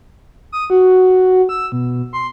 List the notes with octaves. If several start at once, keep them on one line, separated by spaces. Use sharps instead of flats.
D#6
F#4
E6
B2
C6